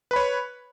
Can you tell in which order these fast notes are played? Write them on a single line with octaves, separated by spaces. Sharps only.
B4 B5 C#5